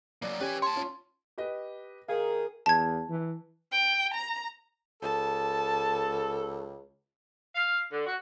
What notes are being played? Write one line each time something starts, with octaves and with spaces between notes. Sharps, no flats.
F#3 A#3 D5
C#4 G4 B4 G#5
C#5 A5 C6
C#4 F4
G4 B4 D#5
D#3 D#4 G#4 A#4 F5
E2 A5 G#6
E3
G5
A#5
C#2 A4 A5
F5
D3
F#4